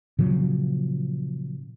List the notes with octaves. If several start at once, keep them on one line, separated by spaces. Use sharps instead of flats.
A#2 C#3 F3 F#3